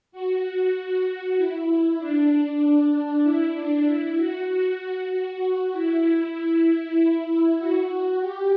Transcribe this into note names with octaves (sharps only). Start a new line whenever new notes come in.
F#4
E4
D4
E4
D4
E4
F#4
F#4
F#4
E4
F#4
G4